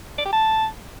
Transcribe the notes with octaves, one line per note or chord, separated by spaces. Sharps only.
D5
G4
A5